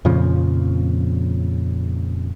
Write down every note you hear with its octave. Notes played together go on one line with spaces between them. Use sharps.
F2 A#2 C#3 F3